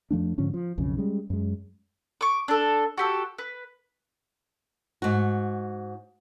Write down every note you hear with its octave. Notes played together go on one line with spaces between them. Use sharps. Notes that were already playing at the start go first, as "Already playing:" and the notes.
F2 F3 A3 D4
G#2 D3 F3 C#4
F3
B1 F2 C#3
G3 G#3 C#4
F#2 G#3
C#6 D6
D4 A4
F#4 G4 A4
B4
G#2 F#4